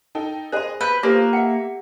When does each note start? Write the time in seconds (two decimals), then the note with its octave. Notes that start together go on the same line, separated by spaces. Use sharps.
0.15 D#4 A4 G5
0.52 G#4 C5 D#5 A5 C6
0.81 B4 G6
1.03 A#3 F4 G4 A4 B4 C5
1.33 E5 F#5 C#7